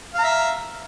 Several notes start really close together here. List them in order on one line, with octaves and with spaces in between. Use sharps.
F5 A#5 E5